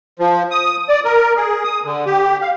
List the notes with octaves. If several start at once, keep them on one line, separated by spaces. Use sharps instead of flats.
F3
D#6
D5
A#4
G#4
D#6
D3
G4
F5